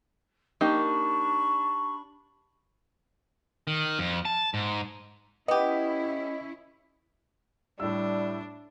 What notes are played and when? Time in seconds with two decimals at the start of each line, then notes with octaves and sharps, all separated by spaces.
0.61 A#3 D4 D#4 G4 B5 C#6
3.67 D#3
3.99 F2
4.25 A5
4.54 G#2
5.48 B3 C#4 E4 G4 D#5
7.80 A2 G3 D4 E4 D5 E6